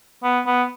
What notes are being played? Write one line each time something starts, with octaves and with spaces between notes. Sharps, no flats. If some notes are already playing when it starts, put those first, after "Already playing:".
B3
B3